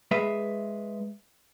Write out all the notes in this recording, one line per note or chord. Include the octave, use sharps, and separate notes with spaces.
G#3 B4 E5